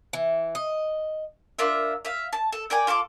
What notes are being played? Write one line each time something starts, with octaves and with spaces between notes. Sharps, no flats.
E3
D#5
D4 F4 A#4 E5
E5 F5
A5
A4
A#4 D5 G5 G#5
F4 A4 C#6 D6